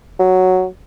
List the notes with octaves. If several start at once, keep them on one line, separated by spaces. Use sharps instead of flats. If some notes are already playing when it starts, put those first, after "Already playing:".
F#3